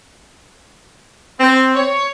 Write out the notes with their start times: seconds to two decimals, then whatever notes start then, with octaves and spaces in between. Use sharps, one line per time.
1.39 C4
1.75 C#5